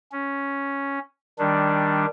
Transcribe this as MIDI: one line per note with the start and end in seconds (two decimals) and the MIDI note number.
0.12 0.99 61
1.39 2.06 51
1.39 2.06 55
1.39 2.06 62